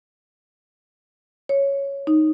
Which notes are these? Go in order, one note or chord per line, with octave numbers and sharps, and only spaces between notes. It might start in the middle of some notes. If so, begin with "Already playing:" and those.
C#5
D#4